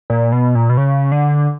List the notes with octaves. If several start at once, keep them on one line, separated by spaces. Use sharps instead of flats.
A#2
B2
A#2
B2
C#3
D3